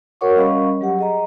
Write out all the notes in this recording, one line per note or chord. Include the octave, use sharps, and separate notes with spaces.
F#4 A#4 C#5 F#5 C#6 D6
G3 C#4 D#5 F5 B5 C#6
F#3 G4 F#5
G#4 D#5 A#5